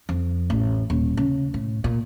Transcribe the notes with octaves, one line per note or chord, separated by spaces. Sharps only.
F2
A1
D#1
C#3
A2
A#2